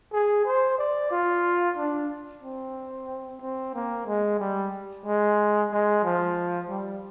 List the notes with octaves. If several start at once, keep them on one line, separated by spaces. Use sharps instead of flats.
G#4
C5
D5
F4
D4
C4
C4
A#3
G#3
G3
G#3
G#3
F3
G3